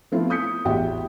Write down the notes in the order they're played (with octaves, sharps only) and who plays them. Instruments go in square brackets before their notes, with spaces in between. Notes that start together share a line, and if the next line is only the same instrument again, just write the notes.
[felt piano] F3 A3 B3 C4 E4 F4
D#6 G6 B6 C#7
A1 E2 F#4 G4 E5 G5